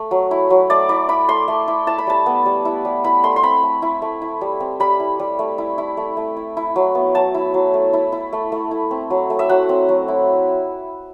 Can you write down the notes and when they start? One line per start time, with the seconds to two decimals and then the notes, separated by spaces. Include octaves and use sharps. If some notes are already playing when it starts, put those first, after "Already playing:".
Already playing: A3
0.11 F#3
0.31 E4
0.50 F#3
0.70 A3 D5
0.89 E4 D5
1.09 E4 B5
1.29 A3 C6
1.48 A3
1.68 E4
1.87 E4 A5
1.98 B5
2.07 G3 A5
2.26 B3
2.46 G3
2.65 E4
2.85 G3
3.04 E4 B5
3.23 A3 C6
3.36 C6
3.43 C4 B5
3.63 A3
3.82 E4
4.02 A3
4.22 E4
4.41 G3
4.60 C4
4.80 G3 B5
5.00 E4
5.19 G3
5.39 A3
5.58 E4
5.78 E4
5.97 A3
6.17 A3
6.37 E4
6.57 E4
6.76 F#3
6.95 B3
7.15 F#3 A5
7.34 E4
7.54 F#3
7.74 A3
7.93 E4
8.12 E4
8.32 A3
8.52 A3
8.71 E4
8.91 C4
9.10 F#3
9.30 A3
9.39 E5
9.49 F#3 F#5
9.69 C4
9.89 F#3
10.08 E4